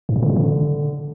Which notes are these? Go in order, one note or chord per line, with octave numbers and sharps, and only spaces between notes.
G#2
A#2
D3
B2
D3